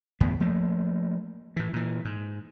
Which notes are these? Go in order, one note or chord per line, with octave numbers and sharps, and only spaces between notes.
G1 E2 A2 B3
F3 A3 A#3
A2 E3
A#2 E3
G#2